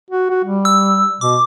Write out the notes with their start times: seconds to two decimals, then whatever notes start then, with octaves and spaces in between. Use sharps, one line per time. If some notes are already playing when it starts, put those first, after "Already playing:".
0.11 F#4
0.30 F#4
0.45 G3
0.65 E6
1.21 B2 D6